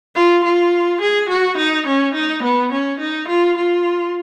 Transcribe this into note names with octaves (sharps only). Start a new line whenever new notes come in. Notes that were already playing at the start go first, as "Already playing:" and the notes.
F4
F4
G#4
F#4
D#4
C#4
D#4
B3
C#4
D#4
F4
F4